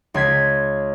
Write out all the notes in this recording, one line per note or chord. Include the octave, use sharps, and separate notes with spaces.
C#2 C6 G#6 B6